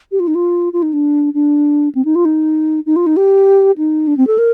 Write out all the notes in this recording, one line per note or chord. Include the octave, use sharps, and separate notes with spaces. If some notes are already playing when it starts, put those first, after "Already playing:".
G4
F4
D#4
F4
F4
D#4
D4
D4
C4
D#4
F4
D#4
D#4
F4
D#4
G4
D#4
D4
C4
A4
A#4